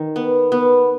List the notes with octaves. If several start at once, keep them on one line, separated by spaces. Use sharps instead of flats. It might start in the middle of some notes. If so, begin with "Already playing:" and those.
Already playing: D#3
B3
B3